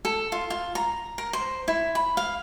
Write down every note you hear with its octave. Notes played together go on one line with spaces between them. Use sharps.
A4
F4
F4
A#5
A#4
C5
E4
B5
F5